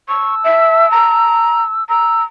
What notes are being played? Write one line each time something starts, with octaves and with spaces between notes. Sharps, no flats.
A5 C#6 E6
E5
A#5
A#5 E6